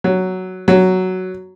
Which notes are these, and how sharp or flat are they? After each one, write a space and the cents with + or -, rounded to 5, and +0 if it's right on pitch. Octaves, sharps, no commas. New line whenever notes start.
F#3 +5
F#3 +5